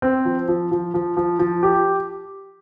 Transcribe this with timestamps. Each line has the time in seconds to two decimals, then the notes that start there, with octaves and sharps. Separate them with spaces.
0.02 C4
0.25 F3
0.48 F3
0.71 F3
0.94 F3
1.17 F3
1.39 F3
1.63 G4